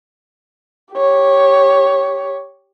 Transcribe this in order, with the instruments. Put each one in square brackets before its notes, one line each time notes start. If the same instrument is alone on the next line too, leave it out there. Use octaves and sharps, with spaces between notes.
[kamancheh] G4 C#5